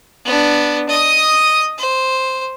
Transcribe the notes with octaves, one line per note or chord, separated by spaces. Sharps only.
B3 D4
D#5 D#6
C5